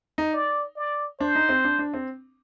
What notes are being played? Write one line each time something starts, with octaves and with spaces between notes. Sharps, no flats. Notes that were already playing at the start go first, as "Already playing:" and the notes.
D#4
D5
D5
D4 C5
D#4
C4
D4
D4
C4